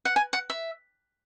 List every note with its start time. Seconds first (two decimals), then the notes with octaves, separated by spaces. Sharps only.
0.05 F#5
0.16 G#5
0.33 F#5
0.50 E5